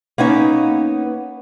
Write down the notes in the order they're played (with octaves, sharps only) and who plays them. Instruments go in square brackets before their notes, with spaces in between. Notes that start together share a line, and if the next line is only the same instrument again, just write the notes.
[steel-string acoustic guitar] A#3 B3 C#4 D#4